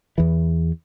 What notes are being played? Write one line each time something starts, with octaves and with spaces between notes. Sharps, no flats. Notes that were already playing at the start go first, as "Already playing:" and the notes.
E2 E3